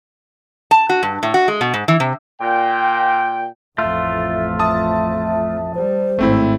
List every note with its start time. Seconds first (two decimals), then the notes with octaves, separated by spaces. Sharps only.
0.71 A5
0.89 F#4
1.03 G2
1.23 A2
1.34 F#4
1.48 G#3
1.61 B2
1.74 G#2
1.88 E3
2.00 C3
2.41 A#2 G5
3.78 A1 F2 A3 F4 E5
4.59 E5 A5 D#6
5.75 G3 C5
6.19 G#1 A2 A3 C4 E4